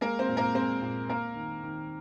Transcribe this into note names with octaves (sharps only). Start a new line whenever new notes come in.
G#3 A#3 A#4
C4 C5
A#2
A#3 A#4
G#3 C4 C5
A#2
A#3 A#4
D#3
D#3